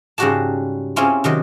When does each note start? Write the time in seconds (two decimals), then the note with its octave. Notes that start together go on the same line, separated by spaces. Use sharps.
0.18 G#2 C#3 G3 F#4 G4 A5
0.96 C4 C#4 E4 F4 G4 G#4
1.24 C3 D#3 F#3